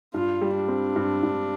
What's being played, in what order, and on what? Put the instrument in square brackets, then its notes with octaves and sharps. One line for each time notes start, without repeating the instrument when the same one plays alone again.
[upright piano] G2 [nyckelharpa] F4
[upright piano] G3
[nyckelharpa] D4
[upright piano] C4
G2
G2